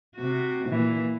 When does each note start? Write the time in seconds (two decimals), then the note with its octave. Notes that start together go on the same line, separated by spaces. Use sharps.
0.16 C3 F#4
0.69 A#2 E3